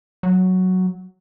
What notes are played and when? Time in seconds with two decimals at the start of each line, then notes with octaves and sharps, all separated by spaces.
0.23 F#3